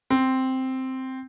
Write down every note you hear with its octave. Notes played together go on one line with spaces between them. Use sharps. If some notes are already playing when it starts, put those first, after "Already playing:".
C4